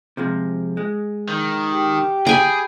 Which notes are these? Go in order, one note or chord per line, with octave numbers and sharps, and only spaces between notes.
C3 F3 G#3
G#3
D#3
G4
G#4 G5 G#5 B5